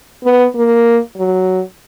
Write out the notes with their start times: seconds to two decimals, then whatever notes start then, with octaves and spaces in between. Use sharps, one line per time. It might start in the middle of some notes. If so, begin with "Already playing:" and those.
0.24 B3
0.55 A#3
1.17 F#3